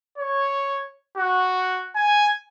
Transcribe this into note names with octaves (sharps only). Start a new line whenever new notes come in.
C#5
F#4
G#5